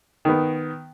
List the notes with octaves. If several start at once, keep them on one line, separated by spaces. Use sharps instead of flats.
D#3 B3